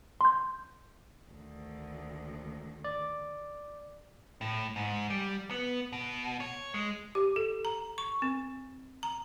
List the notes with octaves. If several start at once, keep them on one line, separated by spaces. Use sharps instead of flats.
C6 G6
D2 D#3
D5
A2
G#2
G3
B3
B2
C#5
G#3
G4
A4
A#5
C#6
C4
A#5